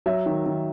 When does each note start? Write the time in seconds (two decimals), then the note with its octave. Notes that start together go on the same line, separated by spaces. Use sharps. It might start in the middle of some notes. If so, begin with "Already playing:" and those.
0.06 F#3 E5
0.26 D#3
0.46 D#3